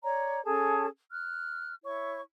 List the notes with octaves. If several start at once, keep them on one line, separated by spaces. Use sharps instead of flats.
C#5 D5 A#5
C#4 G#4 A4 A5
F6 F#6
E4 C#5 C#6